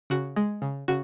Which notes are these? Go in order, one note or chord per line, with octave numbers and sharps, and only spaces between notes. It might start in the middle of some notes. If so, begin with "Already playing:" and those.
C#3 F#4
G#3
C#3
C#3 F#4